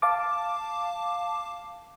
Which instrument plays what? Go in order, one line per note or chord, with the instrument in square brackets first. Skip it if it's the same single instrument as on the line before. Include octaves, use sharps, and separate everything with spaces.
[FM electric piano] F5 A5 D6